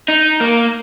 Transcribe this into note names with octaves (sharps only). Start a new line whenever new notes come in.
D#4
A#3